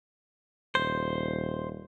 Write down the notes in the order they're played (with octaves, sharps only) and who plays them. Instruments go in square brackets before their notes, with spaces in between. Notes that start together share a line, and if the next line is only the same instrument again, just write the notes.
[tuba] D#1 [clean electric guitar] C5